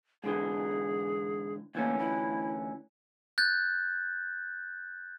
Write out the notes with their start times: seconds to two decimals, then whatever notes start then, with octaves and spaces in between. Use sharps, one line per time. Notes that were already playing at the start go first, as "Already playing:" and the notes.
0.24 G#2 D3 E3 G#4
1.75 D2 E3 A#3 C#4
1.98 E4
3.38 F#6 G6 A6